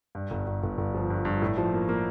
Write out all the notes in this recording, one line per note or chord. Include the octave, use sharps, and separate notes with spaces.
G2
G1
G1
G1
G1
F3
G2
G2
A2
F3
A#3
A#3